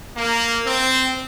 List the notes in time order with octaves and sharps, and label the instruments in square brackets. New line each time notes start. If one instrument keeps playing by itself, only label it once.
[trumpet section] A#3
C4